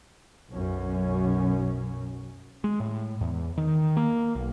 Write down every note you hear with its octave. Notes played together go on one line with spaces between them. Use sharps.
B1 F#2 C#4
G#3
A2
E2
D#3
A#3
B1